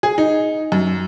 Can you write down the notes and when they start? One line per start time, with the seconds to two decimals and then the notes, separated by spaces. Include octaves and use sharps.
0.03 G#4
0.18 D#4
0.72 F#2